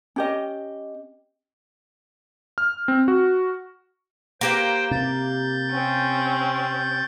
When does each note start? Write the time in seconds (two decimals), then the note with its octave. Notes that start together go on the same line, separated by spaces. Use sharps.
0.16 C#4 G4 D#5
2.58 F6
2.88 C4
3.08 F#4
4.41 A#3 G4 B4 C5 G5
4.91 C3 G6 A6
5.71 C4 C#4